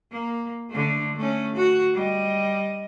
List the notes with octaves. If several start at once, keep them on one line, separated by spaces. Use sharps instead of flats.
A#3
D3 A3
A3 C#4
F#4
G3 D#5